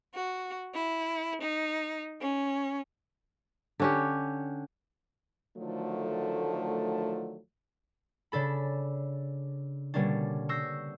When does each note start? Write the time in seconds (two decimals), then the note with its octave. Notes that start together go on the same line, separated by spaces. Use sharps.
0.14 F#4
0.75 E4
1.41 D#4
2.21 C#4
3.80 D3 C#4 G4
5.57 D3 D#3 F3 F#3 A3
8.32 C#3 D4 A4 B5
9.94 B2 D3 G3 A#3 C#4 D4
10.49 C#6 E6 G6 A#6 C7